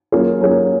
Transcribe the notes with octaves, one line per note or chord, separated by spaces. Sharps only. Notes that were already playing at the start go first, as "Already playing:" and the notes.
F#3 A#3 C#4 F4 G#4
F#3 A#3 C#4 F4 G#4